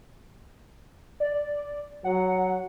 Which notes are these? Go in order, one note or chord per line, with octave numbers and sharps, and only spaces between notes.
D5
F#3 F#5